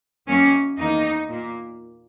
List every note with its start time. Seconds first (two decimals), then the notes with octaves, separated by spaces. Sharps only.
0.27 F#2 D#3 F#3 A#3 C#4
0.77 E2 D#3 A#3 D#4
1.29 A#2 A#3